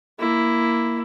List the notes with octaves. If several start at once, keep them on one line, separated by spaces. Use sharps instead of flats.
A#3 E4